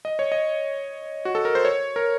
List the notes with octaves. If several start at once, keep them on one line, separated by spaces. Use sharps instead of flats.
D#5
C#5
D#5
F#4
A4
A#4
C5
C#5
A#4